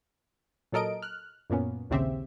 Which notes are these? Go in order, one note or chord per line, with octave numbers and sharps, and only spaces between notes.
A#2 F#3 A4 A#4 D#5 D7
F6 F#6
F#2 A#2 A#3 B3 C#4
A#1 D#2 C#3 C4 G4 E5